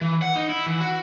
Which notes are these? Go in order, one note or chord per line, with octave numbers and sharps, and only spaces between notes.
E3
F#5
D#4
E4
E3
F#4